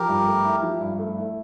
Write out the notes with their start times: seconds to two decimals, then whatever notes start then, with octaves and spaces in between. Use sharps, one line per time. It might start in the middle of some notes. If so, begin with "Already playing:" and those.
Already playing: F3 G4 A#4
0.08 G2
0.27 A3
0.45 E4
0.63 F3
0.81 G2
0.99 A3
1.17 E4